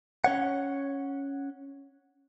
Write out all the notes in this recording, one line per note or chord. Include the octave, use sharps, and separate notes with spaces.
C#4 C#5 F#5